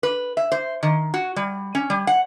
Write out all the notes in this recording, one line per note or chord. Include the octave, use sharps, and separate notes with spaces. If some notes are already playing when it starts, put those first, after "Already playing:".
B4
E5
C5
D#3
F#4
G3
C#4
G3
F#5